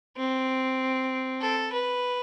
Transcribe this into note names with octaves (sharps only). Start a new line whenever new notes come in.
C4
A4
B4